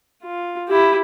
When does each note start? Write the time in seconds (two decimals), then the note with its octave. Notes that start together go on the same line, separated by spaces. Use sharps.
0.23 F4
0.68 E4 G4